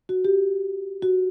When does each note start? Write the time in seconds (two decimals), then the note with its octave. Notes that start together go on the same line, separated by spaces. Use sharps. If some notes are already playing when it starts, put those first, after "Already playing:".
0.09 F#4
0.25 G4
1.02 F#4